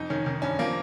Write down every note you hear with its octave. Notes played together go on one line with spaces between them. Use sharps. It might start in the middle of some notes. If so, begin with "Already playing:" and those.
Already playing: F2 D#4
D#3 C#4
D#3
G2 C#4
F3 A#3